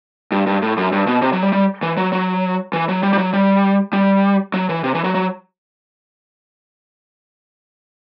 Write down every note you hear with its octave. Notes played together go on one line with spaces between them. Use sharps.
G2
G2
A2
F#2
G2
B2
C3
F#3
G3
G3
E3
F#3
F#3
E3
F#3
G3
G3
F#3
G3
G3
F#3
E3
C3
E3
F#3
F#3